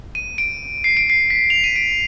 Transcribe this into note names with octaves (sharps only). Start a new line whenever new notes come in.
D#7
D7
C7
D7
C7
B6
F7
D#7
D7